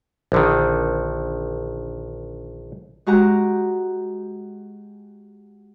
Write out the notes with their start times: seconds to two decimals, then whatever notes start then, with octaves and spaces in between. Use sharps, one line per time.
0.32 A#1 D3 D#3
3.06 G#3 F#4 G4 A#5